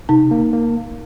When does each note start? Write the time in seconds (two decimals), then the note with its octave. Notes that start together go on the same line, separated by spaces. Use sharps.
0.09 C3 D#4
0.31 A#3
0.53 A#3